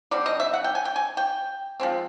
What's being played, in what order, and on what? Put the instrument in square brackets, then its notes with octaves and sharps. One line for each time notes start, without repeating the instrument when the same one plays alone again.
[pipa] D3 G3 C4 D5
D#5
E5
F#5
G5
G#5
G5
G#5
G5
F3 G#3 C4